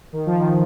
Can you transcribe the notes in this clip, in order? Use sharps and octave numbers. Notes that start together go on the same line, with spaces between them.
D#3
F3
D#3